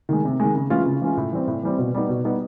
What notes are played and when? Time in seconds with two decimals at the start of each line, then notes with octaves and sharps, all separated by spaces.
0.09 D#3 G#3
0.25 C3
0.40 D#3 G#3
0.55 C#3
0.70 E3 G#3 C#4 F4
0.86 C#3
1.02 E3 G#3 C#4 F4
1.17 A2
1.32 E3 G3 C4
1.47 A2
1.63 E3 G3 C4
1.79 B2
1.95 G3 B3 D#4
2.09 B2
2.25 G3 B3 D#4